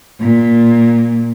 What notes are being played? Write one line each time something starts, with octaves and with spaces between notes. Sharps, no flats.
A#2